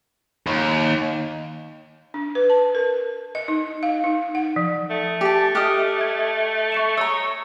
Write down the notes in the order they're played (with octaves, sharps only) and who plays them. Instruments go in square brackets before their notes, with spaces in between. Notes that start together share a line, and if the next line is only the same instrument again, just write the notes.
[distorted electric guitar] D#2
[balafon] D4
B4
A5
A#4
D#5
D#4
F5
D#4
F#5
F3
[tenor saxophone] A3
[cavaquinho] G4 A5
[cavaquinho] G4 D#5 [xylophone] D#6 F6 F#6
[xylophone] G#6
C#6 C#7 E7
[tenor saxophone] C#5 [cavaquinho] D#5 A#5 [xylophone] E6